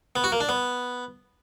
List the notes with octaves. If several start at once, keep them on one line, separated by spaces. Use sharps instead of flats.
B3
F#4
A#3
D4
B3